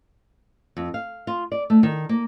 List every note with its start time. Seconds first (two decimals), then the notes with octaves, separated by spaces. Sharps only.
0.77 F2
0.94 F5
1.27 F4
1.52 D5
1.70 A3
1.83 D#3
2.09 A#3